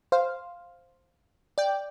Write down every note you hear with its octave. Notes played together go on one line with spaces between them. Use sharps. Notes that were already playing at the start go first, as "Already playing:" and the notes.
C5 F5
D5 G5